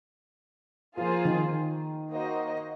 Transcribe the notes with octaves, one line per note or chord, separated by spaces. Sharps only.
F3 A#3 F4 G#4 C5
D#3
A#3 D#4 F#4 C5 D#5